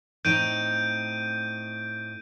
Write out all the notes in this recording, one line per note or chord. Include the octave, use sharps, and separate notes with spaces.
A2 C4 D#4 G6 D7 D#7